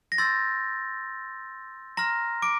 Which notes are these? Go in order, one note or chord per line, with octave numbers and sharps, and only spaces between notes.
A#6
C6 E6 G6 A6
A#5 C6 F6 A#6
D6 D7